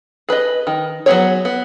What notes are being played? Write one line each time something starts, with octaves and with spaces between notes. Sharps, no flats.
G#4 B4 D#5
D#3
F#3 B3 G#4 C#5
B3